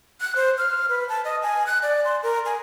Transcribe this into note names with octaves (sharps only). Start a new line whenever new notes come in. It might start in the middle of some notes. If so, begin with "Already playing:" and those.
F#6
C5
F6
B4
A5
D#5
G#5
F#6
D5
C6
A#4
G#5